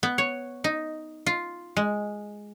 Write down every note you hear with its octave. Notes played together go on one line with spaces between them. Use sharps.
B3
C#5
D#4
F4
G#3